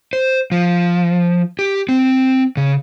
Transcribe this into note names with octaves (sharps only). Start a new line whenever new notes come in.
C5
F3
G4
C4
C#3